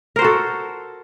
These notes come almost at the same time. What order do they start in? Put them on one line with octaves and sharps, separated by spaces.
A#4 C5 F#4 A4